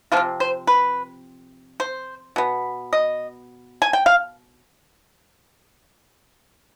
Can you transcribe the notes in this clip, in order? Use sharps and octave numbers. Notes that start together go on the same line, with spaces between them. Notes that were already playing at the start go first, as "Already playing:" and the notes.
C3 F3 C4 F4
C5
B4
C5
B2 B3
D#5
G#5
G5
F5